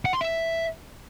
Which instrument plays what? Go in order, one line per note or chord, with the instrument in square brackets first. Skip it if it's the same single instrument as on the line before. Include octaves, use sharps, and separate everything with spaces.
[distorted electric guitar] F#5
C6
E5